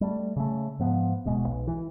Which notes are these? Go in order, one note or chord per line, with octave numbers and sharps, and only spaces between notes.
G3 A3
C#3 A3
G#2 F3 B3
D1 B2 G#3
B1
E3